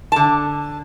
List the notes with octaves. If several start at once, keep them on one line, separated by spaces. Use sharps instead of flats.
D3 A5